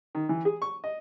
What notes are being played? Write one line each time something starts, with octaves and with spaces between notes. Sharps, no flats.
D#3
E3
G#4
C#6
D#5